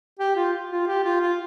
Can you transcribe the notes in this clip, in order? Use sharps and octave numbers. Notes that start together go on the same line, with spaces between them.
G4
F4
F4
G4
F4
F4